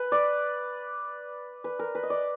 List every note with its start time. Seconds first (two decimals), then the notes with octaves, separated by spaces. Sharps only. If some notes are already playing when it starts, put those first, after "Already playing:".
Already playing: B4
0.12 D5
1.64 B4
1.79 A#4
1.95 B4
2.03 D#5
2.10 D5